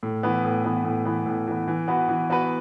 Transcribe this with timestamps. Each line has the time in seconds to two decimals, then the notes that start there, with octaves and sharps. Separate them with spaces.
0.03 A2
0.23 E3 B3
0.45 A2
0.64 E3 B3
0.85 A2
1.05 E3 B3
1.26 A2
1.48 E3 B3
1.68 E3
1.88 B3 F#4 B4
2.09 E3
2.30 B3 F#4 B4